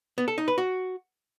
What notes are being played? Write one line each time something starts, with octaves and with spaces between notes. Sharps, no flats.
B3
A4
D#4
B4
F#4